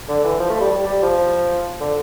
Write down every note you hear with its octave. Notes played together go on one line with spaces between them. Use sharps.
D3
E3
F3
A3
G3
G3
G3
F3
D3